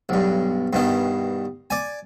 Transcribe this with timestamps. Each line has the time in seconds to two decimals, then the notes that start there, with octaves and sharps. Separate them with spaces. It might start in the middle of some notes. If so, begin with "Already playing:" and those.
0.09 B1 G2
0.73 G2 B2 D#3
1.70 D5 G#5